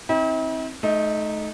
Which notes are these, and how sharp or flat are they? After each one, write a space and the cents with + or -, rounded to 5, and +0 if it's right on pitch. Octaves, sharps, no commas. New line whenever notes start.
C4 +20 E4 -45
A3 -30 D#4 +0